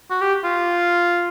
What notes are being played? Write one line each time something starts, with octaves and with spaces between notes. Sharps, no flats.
F#4
G4
F4